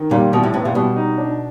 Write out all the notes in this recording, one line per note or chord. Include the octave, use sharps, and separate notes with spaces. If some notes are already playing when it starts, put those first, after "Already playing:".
Already playing: D#3
A#2 G3
B2 E3
A2
A2 B3
A#2
B2 G3
D#4
D4